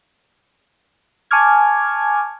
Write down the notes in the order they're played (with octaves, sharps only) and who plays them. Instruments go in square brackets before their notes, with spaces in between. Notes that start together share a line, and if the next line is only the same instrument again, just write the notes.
[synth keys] G#5 A5 C#6 D6 F6 G#6